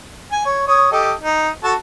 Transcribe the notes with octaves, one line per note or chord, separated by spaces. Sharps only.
G#5
C#5
C#5 D#6
G4 A4 D#5
D#4
F#4 A4 A5